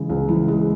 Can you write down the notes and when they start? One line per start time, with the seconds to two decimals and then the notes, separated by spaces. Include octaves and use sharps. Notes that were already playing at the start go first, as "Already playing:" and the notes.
Already playing: C#3 E3 G#3
0.09 C#2
0.28 E3
0.48 G#3